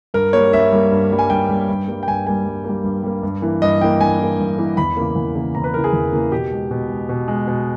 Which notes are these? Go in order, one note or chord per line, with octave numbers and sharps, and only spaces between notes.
G2 A#4
G3 A#3 C#5
G2 E5
G3 A#3
G2
G3 A#3
G#5
G2 G5
G3 A#3
G2
G3 A#3
G5
G2 G#5
G3 A#3 G#5
G2
G3 A#3
G2
G3 A#3
G2
E3 A#3
G2 D#5
E3 A#3 G5
G2 G#5
E3 A#3
G2
E3 A#3
E2 B5
C#3 E3 A#3
E2
C#3 E3 A#3
E2 A#5
B4
C#3 E3 A#3 A#4
G#4
E2
C#3 E3 A#3
B2 G4
G#3
B2
G#3
B2
G#3
B2